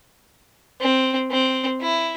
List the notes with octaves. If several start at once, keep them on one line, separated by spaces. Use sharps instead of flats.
C4
C4
E4